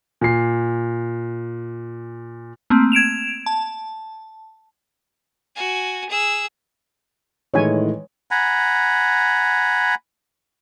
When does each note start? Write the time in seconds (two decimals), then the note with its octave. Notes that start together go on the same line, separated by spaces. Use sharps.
0.21 A#2 C7
2.70 A3 A#3 C4
2.92 G#6 D7 E7 F7
3.46 A5
5.55 F#4 G#5
6.09 G#4 E6
7.54 A2 D#3 E3 G#3 C#5 G#5
8.31 F#5 G#5 A#5 B5